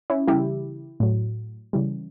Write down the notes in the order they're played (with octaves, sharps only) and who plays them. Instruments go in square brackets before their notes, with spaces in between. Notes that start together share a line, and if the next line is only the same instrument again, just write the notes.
[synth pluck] C#4 E4
C#3 E3 G3 E4 G4
A2 F#3
C#3 E3 G3